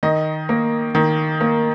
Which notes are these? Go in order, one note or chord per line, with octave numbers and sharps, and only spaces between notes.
D#3 D#5
A#3
D#3
A#3